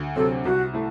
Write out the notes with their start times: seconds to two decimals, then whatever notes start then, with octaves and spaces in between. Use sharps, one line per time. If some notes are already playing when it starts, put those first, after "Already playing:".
Already playing: D2
0.16 C3 F#3 C4 A4
0.45 C2 F#4
0.74 A3 E4